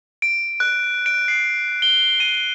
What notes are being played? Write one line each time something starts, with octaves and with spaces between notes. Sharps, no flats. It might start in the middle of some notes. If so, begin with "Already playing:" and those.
D7
F#6
D7
C7
G7
D#7